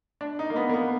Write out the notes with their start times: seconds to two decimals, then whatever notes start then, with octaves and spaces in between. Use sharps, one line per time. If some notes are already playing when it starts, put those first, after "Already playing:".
0.21 D4
0.39 D#4
0.50 A#3
0.56 B3
0.69 A#3
0.74 B3